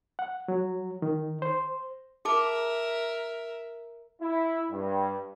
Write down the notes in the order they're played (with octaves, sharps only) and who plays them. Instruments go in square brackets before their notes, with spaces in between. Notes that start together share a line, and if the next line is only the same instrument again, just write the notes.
[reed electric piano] F#5
F#3
D#3
C5
[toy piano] G#4 A5 D6 [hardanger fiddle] A#4 E5
[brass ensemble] E4
G2